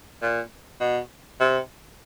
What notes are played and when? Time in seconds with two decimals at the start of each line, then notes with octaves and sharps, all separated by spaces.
0.22 A#2
0.80 B2
1.40 C3